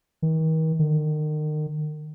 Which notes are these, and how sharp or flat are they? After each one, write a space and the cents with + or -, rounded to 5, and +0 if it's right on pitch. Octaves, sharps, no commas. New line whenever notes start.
D#3 +40
D#3 -35